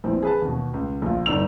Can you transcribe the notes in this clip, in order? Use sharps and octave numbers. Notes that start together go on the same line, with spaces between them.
A#1 E3 C4
G#4 B4 A5
D#2 B2
C#2
A#1 F4
G1 D4 D#4 E6 F7